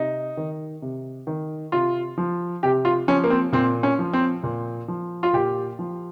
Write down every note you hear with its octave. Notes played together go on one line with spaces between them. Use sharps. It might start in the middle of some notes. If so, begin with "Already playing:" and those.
Already playing: C3 D#4
D#3
C3
D#3
C3 F4
F3
C3 G4
F4
F3 C#4
A#3
C4
A#2 C4
C#4
F3
C4
A#2
F3
F4
A#2 G4
F3